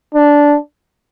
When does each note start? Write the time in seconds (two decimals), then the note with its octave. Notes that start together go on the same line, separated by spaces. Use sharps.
0.15 D4